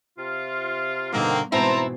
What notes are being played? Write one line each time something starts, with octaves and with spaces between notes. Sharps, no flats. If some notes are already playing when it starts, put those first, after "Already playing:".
C3 F4
G2 B2 D3 D#3 A#3 C4
G#2 B2 E3 C4 E4 C5 A5 A#5